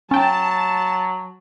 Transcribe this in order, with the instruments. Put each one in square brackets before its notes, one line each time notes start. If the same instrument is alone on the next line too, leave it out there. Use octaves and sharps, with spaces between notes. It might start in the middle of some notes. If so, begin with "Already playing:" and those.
[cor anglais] F#3 [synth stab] C#4 G5 [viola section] A5